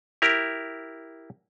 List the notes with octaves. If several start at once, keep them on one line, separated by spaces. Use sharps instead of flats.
E4 G4 A#4